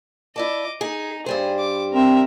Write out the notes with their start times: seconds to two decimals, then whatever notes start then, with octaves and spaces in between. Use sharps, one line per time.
0.36 E4 D5 D#5 A5 D6
0.81 D#4 G#4
1.26 G2 G3 G#4 C5
1.59 D6
1.93 C4 A#4 E5